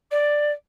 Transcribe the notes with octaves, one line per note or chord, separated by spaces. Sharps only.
D5